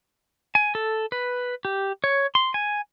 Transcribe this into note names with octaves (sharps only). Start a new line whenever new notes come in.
G#5
A4
B4
G4
C#5
C6
G#5